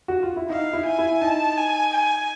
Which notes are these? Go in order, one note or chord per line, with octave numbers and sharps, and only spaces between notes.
F#4
F4
E4
D#4 F5
E4
G#5
E4
D#4 A5
G#5
G#5